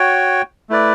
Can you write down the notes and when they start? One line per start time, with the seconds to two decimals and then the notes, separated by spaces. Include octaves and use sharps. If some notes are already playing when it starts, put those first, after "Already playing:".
Already playing: F#4 C#5 G5
0.70 A3 E4 B4 D5